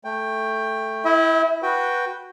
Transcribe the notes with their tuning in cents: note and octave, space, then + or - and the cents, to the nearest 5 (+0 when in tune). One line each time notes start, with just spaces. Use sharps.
A3 +0 G5 +15
E4 +0 E5 -40 G5 +0
F#4 +0 B4 -15 G5 +0